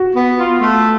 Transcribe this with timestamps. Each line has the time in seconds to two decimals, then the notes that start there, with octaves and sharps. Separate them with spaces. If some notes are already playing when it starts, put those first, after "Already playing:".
Already playing: F#4
0.16 B3
0.39 F4
0.62 A3